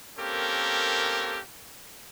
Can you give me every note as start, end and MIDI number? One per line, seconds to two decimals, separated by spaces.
0.18 1.40 58
0.18 1.40 60
0.18 1.40 61
0.18 1.40 67
0.18 1.40 69
0.18 1.40 70